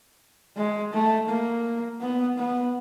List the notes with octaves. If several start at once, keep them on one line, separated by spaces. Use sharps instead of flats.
G#3
A3
A#3
B3
B3